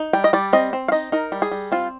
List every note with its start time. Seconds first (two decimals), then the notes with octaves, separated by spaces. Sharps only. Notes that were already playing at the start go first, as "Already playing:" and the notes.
Already playing: D#4
0.13 G3 G5
0.24 D#5
0.33 G3 D5
0.53 C4 D#5
0.73 C4
0.88 F5
0.92 D#4 D#5
1.12 D#4 A#4
1.32 G3
1.42 G#4
1.51 G3
1.72 C4 F4